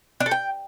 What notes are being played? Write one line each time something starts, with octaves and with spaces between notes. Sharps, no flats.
D4
A4
G5